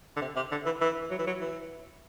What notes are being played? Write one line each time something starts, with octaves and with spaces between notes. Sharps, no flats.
D3
C3
C3
D3
E3
E3
F#3
E3
F#3
E3